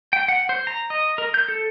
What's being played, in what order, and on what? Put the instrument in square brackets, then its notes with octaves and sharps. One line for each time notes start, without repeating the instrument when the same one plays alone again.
[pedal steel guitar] G5
F#5
C5
A#5
D#5
A#4
G6
A4